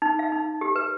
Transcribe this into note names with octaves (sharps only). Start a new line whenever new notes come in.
D#4
F5
D#4
G4
B4